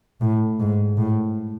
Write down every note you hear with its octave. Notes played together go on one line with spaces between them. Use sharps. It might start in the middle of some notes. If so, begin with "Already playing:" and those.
A2
G#2
A2